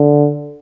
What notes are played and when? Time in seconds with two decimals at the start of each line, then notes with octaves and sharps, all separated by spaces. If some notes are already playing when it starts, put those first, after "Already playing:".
Already playing: D3